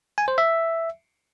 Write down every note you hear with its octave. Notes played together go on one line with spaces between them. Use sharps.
G#5
C5
E5